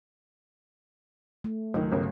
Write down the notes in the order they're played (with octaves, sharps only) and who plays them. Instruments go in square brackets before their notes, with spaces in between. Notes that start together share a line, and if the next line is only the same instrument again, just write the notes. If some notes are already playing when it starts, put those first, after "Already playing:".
[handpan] A3
[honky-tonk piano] C#2 D#3 [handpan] F#3 A3
[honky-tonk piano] G1 C#3 A#4